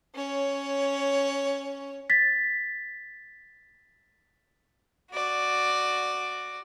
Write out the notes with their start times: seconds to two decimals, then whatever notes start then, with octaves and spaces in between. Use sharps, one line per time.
0.15 C#4 C#5
2.10 A6 B6
5.12 F#4 D5